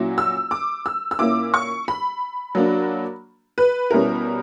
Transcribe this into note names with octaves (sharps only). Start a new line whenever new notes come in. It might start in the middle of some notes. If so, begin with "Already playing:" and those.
Already playing: A#2 F#3 C#4 E4
E6
D6
E6
E6
A#2 A#3 C#4 E4 D6
C#6
B5
F#3 A#3 D4
B4
B2 G3 C#4 E4 A#4